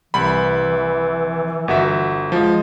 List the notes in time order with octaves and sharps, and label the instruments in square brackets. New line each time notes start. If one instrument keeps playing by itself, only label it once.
[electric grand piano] C2 B5 [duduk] E3
[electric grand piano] G1 F#4 E5
[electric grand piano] F3 [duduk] G#3